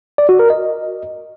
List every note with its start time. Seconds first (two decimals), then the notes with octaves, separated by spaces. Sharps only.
0.18 D5
0.29 F#4
0.39 A#4
0.50 D#5